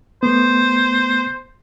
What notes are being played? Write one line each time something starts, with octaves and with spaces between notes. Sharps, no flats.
A3 B3 C5